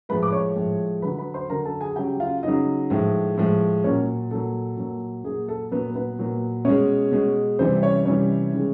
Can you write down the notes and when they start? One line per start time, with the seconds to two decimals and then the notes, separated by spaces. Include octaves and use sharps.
0.09 A2 F3 G#3 B4 B5
0.23 D6
0.32 C#5 C#6
0.56 A2 F3 G#3
1.02 D3 F#3 B4 B5
1.18 B4 B5
1.34 C5 C6
1.50 D3 F#3 A#4 A#5
1.65 A4 A5
1.81 G#4 G#5
1.96 C#3 F#3 G4 G5
2.20 F4 F5
2.43 C#3 F#3 D#4 D#5
2.90 A2 F3 G#3
3.38 A2 F3 G#3
3.84 A#2 F#3 C#4 C#5
4.31 A#2 F#3 A4
4.77 A#2 F#3
5.24 A#2 F#3 G#4
5.48 A4
5.72 A#2 F#3 B3 B4
5.95 B3 B4
6.19 A#2 F#3
6.65 B2 G#3 C#4 C#5
7.12 B2 G#3
7.59 C3 E3 G3 C4 C5
7.82 C#4 C#5
8.05 C3 E3 G3 C#4 C#5
8.53 C#3 E3 G#3